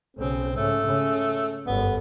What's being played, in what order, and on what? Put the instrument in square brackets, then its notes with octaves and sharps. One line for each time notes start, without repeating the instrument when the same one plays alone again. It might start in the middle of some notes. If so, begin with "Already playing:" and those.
[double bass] B1 C#3 [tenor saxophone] C4
[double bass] G#2 C#3 [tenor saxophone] A3
[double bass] C#3
[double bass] G1 F#2 [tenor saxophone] B3